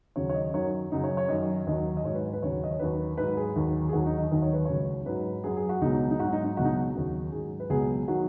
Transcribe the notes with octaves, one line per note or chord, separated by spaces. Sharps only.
D#2 C#3 F#3 C#5
C#5
D#5
F#2 D#3 F#3 C#5
F#2 C#3 F#3 D#4
C#5
C#5
F#2 D#3 F#3 D#5
D#2 D#3 F#3 D#5
D#5
G#2 F#3 C#5
B4
B4
D#2 C#3 F#3 C#5
D#5
C#5
D#2 D#3 F#3 B4
G#2 F#3 B4
G#4
D#2 D#3 F#3
G#4
D#2 D#3 F#3 F#4
D#4
D#5
D#2 D#3 F#3 D#5
C#5
B4
C#2 C#3 F#3 C#5
G#2 F#3 B4
F#2 F#3 G#4
G#4
F#4
C#2 B2 F#3 D#4
D#4
G#2 F#3 F#4
D#4
D#4
C#2 B2 F#3 F#4
D#4
F#4
D#2 C#3 F#3
G#2 F#3 G#4
B4
C#2 B2 F#3 G#4
D#3 F#3 F#4